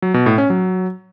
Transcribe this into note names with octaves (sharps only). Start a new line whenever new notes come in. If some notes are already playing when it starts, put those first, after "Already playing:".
F#3
B2
A2
C#4
F#3